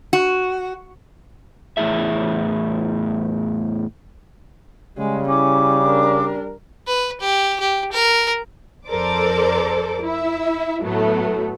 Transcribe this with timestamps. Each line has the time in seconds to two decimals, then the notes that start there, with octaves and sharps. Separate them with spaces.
0.13 F#4
1.77 E2 A2 C#4 E4 G#4 E5
4.98 C#3 G3 G#3
5.28 C#4 E4 D6
5.85 D4 A#4
6.87 B4
7.21 G4
7.60 G4
7.92 A#4
8.87 F2 A4 A#4 C5 D5 D6
10.01 E4 E5
10.82 A2 F#3 A3 B3